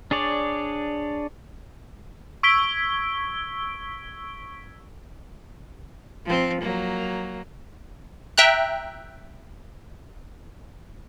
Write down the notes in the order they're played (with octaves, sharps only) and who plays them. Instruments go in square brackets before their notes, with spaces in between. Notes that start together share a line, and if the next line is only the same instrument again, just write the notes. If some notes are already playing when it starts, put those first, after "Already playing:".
[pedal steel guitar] D4 G#4 C#5 D5
[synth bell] C#6 E6 G#6 B6 D7 G7
[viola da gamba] F3 C4
F#3 A#3
[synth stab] E5 G5 A#5 F#6